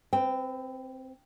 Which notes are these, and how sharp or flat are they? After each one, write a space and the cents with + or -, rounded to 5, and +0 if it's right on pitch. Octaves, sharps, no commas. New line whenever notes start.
C4 +0 B4 +35 G5 +0